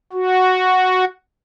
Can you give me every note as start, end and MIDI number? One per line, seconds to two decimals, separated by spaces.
0.13 1.05 66